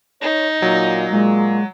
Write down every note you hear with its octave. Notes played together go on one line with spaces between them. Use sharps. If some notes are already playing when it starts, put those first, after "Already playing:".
D#4 C#5
A#2 F#3
A#2 G#3